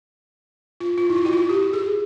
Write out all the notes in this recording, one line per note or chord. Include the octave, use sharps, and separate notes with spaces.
F4
F4
E4
F4
F#4
F4
G4
G#4